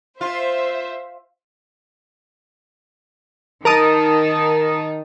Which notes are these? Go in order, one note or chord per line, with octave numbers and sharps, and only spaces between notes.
F4 C5 E5
D#3 D#4 A#4 A5 D#6